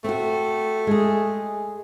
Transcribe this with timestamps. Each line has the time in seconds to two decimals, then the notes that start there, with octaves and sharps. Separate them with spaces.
0.04 A3 C4 F#4
0.87 G#3 G#4